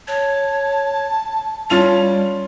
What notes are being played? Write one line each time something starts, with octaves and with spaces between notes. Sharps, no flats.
C#5 A5
G3 C#4 F4 F7